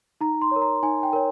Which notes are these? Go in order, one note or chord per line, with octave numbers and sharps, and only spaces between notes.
D#4 A#5
C6
A#4 C#5
A#5
D#4 G#5
G5
A#4 C#5